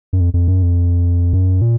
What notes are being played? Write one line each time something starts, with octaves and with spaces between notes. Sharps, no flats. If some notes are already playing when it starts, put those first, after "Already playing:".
F#2
F2
F2
F#2
F2
F#2
A#2